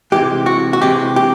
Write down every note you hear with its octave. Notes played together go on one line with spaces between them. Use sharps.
C3 E3 G#3 G4
F#4
F#4
C3 E3 G#3 G4
G4